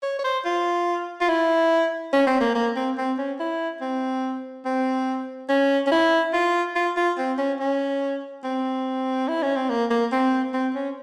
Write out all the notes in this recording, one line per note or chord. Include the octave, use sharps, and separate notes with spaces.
C#5
C#5
C5
F4
F4
E4
C#4
C4
A#3
A#3
C4
C4
C#4
E4
C4
C4
C#4
C#4
E4
F4
F4
F4
C4
C#4
C#4
C4
E4
C#4
C4
A#3
A#3
C4
C4
C#4